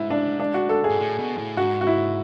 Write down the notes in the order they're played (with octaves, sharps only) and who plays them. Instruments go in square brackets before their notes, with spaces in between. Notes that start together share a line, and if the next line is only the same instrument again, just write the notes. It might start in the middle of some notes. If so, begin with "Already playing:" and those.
Already playing: [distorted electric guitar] G#2 [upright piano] E4
[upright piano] D4
D4
F#4
A4
G#4
[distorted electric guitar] G#2
A2
B2
A2
[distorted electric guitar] G#2 [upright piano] F#4
[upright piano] F#4
E4